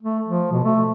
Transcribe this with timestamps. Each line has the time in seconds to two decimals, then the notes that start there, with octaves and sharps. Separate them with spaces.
0.02 A3
0.28 F3
0.52 B2
0.64 A3